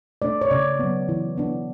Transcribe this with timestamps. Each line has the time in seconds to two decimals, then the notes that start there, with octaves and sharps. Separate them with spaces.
0.22 A3 D4 D5
0.41 C#5
0.51 C#3 D5
0.79 F#3 B3
1.09 E3
1.38 B3 D4